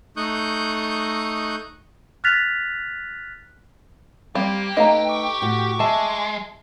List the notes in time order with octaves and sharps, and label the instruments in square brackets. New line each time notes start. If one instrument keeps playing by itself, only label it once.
[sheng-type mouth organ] A3 D#4 C#6 D#6 F#6 G6
[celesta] F6 F#6 A6 B6 F7
[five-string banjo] G3 C4 F5 [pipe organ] A#3 [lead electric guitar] G4
[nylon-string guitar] A3 D#4 B4 [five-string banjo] D#5 F5 A#5
[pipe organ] C#6 D6
[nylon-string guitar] A2 F#4
[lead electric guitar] G#3 [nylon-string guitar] E5 [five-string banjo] A5